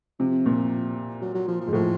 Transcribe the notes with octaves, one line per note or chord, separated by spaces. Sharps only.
C3 F3
A#2
F#3
F#3
F3
F3
G#2
A2 F3